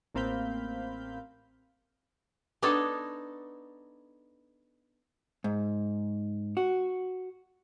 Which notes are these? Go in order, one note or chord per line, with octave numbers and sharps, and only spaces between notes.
A1 A#3 C4 F5 B5 G6
B3 D4 D#4 A4 C#5
G#2
F#4